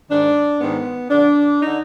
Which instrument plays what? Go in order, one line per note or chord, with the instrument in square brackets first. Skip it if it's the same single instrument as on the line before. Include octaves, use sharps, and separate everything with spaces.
[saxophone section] G#2 D#3 D4
G#2 D#3 B3
F2 D3 D4
D3 D#4